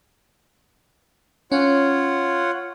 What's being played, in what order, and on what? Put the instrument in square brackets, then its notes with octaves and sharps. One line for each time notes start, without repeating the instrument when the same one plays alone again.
[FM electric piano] C#4 [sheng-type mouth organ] F4 C#5 F#5